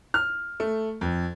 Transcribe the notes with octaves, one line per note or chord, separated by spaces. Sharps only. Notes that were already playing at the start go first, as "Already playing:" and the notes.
F6
A3
F2